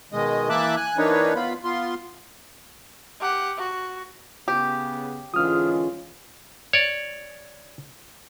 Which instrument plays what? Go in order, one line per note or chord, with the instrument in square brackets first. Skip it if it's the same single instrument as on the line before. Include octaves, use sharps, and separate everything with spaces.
[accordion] B2 D#3 G#3 D#5
E3 A#3 E5 A5 D6 F#6
G#5 F#6
E3 A#3 D4 D#4 B4 C#5
B3 F4 B5
B3 F4 C6
[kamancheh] G4 F#5
F#4
[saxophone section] C#3 B3 [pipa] G4
[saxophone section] G#2 D3 E3 [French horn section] G#3 C#4 F4 [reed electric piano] D#6 F6
[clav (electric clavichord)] C#5 D5